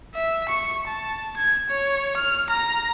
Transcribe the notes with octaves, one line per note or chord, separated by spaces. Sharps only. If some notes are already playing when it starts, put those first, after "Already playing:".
E5
C#6
A5
G#6
C#5
F6
A#5